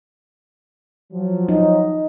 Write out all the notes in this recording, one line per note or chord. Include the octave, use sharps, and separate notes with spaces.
F3 F#3
D#4